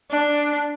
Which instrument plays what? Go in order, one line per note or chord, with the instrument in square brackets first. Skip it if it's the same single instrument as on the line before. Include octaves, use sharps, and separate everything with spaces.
[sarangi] D4